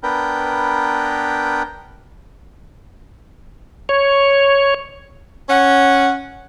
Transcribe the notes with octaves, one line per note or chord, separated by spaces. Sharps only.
B3 D4 A#4 B4 G5
C#5
C#4 F#5